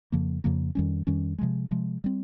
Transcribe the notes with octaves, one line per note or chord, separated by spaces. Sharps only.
F2 C#3 F3 A#3
F2 C#3 F3 A#3
F2 D#3 G3 C#4
F2 D#3 G3 C#4
C3 F3 G#3
C3 F3 G#3
G3 C4